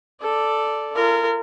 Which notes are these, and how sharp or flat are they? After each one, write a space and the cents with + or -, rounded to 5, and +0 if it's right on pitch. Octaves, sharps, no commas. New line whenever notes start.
A4 +0 D5 +0
F4 -35 A#4 -25